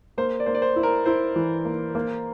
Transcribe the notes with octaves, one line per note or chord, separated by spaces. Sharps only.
A#3 C5
D5
A#3 C5
D5
C5
E4
A#4
E4 C5
E3
A#3
A#3